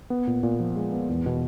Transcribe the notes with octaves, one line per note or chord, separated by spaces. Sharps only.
B3
A#2
A#2
F3
G#3
B3
E2
B2